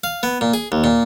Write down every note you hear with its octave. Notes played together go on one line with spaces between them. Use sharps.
F5
B3
A#2
G#4
D#2
A#2